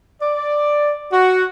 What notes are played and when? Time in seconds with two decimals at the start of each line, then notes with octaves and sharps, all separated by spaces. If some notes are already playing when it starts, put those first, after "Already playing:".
0.22 D5
1.12 F#4